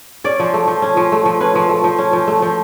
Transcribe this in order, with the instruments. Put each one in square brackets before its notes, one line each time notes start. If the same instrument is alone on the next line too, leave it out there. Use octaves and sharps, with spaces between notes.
[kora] C#4 D5
F3
A3
F3
C#4
F3
A3
F3
C#4 B4
F3
A3
F3
C#4
F3
A3
F3